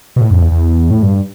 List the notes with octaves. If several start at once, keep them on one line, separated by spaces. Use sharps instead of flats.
B2
A2
F2
E2
E2
A2
G2